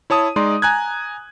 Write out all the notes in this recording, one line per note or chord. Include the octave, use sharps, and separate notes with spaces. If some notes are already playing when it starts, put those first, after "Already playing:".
E4 C#5 A5 D#6
G#3 D#4 D5 C6
G#5 A#5 F#6 G#6